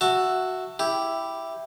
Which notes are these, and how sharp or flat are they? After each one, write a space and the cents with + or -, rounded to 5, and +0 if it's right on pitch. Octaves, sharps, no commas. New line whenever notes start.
F#4 +0 E5 +0 A5 +20
E4 +0 G4 +0